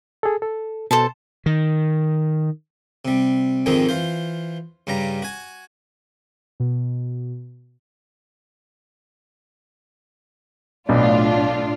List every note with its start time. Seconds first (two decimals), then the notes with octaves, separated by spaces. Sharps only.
0.23 G#4 A4
0.42 A4
0.91 B2 A4 C5 A5
1.46 D#3
3.05 C3 G3
3.66 F2 G#2 D#3 G#3 C4 D#4
3.89 E3 F4 C5
4.87 G2 C#3 G3 A#5
5.22 F#4 G#5
6.60 B2
10.89 B1 A2 B3 D4 F4